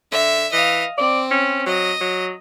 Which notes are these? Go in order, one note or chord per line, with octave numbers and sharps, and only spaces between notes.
D3 E5
E3 D#5 F5
C4 D5
C#4
F#3 D#5
F#3